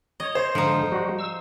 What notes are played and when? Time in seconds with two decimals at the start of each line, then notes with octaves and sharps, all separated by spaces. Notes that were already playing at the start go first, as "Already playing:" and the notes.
0.20 C#5 D#5
0.35 C5
0.55 G#2 D3 F3 D#4
0.92 G3 F#4
1.19 E6